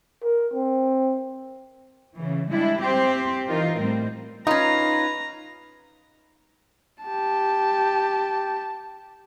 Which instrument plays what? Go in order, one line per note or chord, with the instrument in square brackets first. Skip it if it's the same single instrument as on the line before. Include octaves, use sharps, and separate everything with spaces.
[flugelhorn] A#4
C4
[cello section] C#3 E3
G3 G#3 D4 E4
C4 G4 C5
E3 D#4 F4 A#4
A2 G3 C4
[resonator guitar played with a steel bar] C#4 F4 [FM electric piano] D#4 [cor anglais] B4 [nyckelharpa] A#5
[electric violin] G4 A5